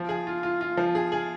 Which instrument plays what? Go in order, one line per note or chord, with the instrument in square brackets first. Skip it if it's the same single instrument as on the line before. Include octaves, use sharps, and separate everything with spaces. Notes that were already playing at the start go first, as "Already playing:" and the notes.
Already playing: [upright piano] F3
G#4
F4
F4
F4
F3
G#4
G#4